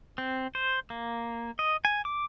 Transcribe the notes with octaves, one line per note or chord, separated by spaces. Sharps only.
C4
C5
A#3
D#5
G#5
D6